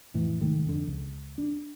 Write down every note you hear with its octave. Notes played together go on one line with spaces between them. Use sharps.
F2 A2 E3
C2 G#2 D#3 A3
F2 D3
C#2
D4